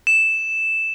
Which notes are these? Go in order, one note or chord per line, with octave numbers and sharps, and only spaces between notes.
E7